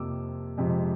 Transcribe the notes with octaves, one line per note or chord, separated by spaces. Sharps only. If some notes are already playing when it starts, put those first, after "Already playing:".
Already playing: F2 C3 F3 A#3 D6 E6
F2 C3 F3 G#3